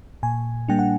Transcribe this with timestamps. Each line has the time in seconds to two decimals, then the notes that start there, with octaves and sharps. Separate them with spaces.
0.23 A#2 G#5
0.68 G3 A#3 D4 G5
0.79 F#5